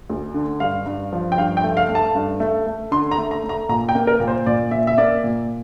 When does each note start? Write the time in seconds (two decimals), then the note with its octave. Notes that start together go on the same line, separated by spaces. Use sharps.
0.10 D2
0.34 D3
0.60 G2 F5
0.86 G2
1.13 F3
1.32 G5
1.38 G2 F5
1.57 G5
1.64 A3
1.77 F5
1.89 A3
1.95 A5
2.15 G2
2.40 A3
2.67 A3
2.91 D3 C6
3.11 A#5
3.18 A3
3.31 A#5
3.44 A3
3.49 A#5
3.69 A#2 A#5
3.89 G5
3.95 A#3
4.07 A#4
4.20 A#2
4.28 C5
4.46 A#2 D5
4.71 A#2 E5
4.87 E5
4.98 A#3 D5
5.24 A#2